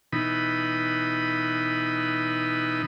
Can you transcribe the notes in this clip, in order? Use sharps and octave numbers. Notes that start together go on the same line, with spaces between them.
B2 E3 D#4 B5